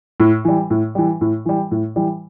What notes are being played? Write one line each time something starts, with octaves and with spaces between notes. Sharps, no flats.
A2
E3 G3
A2
E3 G3
A2
E3 G3
A2
E3 G3